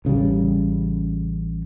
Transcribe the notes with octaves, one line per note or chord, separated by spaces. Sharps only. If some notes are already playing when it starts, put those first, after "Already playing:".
A1 C#3 F3 G3